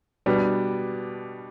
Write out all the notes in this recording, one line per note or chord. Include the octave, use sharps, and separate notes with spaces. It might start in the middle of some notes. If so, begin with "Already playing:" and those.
B2 G3 B3 D4